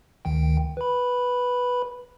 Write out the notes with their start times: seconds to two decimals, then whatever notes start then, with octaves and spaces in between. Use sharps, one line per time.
0.25 D2 D#3 G5
0.77 B4 B5